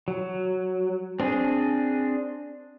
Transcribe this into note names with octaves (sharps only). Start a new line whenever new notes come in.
F#3
C4 D4 G#4